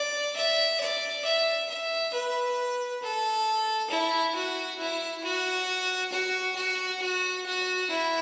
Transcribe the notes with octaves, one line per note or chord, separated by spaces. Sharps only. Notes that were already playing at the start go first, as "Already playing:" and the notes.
Already playing: D5
E5
D5
E5
E5
B4
A4
E4
F#4
E4
F#4
F#4
F#4
F#4
F#4
E4